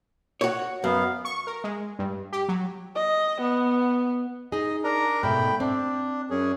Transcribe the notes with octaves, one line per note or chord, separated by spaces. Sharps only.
F#4 C#5
F#2 B3 F5
C#6
A#4
G#3
G2
G4
F#3
D#5
B3
D#4 G#4 D#5
D4 A#4 A#5
G#2 B2 A3 G5 B5
C4 D4
F#2 C#4 G#4